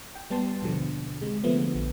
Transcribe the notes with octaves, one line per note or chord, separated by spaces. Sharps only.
G5
G3 B3 A5 C6
D#2 B2 D3 F3
C3 G#3
D3 F3 A3 B3
A#1